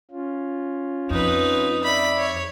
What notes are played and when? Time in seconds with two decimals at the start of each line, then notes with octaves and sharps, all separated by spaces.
0.11 C#4 F4
1.10 F2 D#4 B4
1.83 D5 E5 B5
2.17 C#5